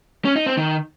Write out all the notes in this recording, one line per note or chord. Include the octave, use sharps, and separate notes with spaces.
C#4
D#4
C4
D#3